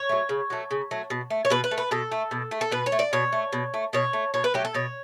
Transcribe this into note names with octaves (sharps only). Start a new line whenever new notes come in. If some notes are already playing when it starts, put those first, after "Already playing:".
Already playing: C#5
F#3 A3
C#3
F#3 A3
C#3
F#3 A3
B2
A3
C#5
B2 B4
B4
A3
B4
B2 A4
A3
B2
A3
A4
B2 B4
C#5
A3
D5
B2 C#5
A3
B2
A3
B2 C#5
A3
B2 C#5
B4
F#3 A3 G4
A4
B2 C#5